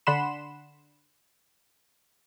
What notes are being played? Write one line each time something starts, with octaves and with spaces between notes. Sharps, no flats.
D3 D4 F#5 B5 C6 E7